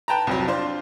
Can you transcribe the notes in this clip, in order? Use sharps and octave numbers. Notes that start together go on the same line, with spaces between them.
B4 G5 A5 A#5
C2 F2 F#3
D4 F4 C5